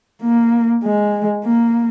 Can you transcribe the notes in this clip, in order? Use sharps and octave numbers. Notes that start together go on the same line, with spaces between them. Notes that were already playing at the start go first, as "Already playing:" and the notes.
A#3
G#3
A#3